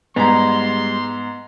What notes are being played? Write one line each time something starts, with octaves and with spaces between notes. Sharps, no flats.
G#2 G3 G#3 B3 A#5 C6